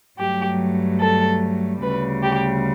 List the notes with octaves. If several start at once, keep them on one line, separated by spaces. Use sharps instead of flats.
G2 F#3 A3 G4
A4
D2 C#3 G3 B4
G4